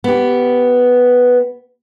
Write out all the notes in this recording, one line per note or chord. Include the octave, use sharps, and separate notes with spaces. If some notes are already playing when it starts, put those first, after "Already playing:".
B3 G4